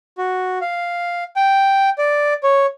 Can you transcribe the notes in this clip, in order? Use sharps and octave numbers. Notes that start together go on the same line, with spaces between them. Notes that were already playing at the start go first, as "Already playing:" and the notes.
F#4
F5
G5
D5
C#5